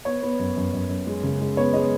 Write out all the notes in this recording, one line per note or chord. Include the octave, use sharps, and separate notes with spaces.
B3 C#5
B3
F#2
F#2
F#2
F#2
G#3
C#3
G#3
B3 C#5
G#3 D#5